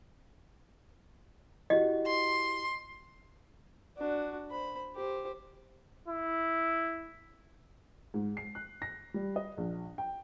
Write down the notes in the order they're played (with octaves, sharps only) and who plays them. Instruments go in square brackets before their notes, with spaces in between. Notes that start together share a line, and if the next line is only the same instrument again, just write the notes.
[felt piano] E4 F#4 G4 [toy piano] D#5
[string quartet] C6
[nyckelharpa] D4 F#4
C5 B5
G4 C5
[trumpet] E4
[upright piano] G#2
C7
F#6
A#6
G3
D#5
A#1
G5